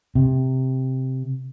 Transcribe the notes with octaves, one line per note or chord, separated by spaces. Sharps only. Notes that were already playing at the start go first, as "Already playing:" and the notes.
C3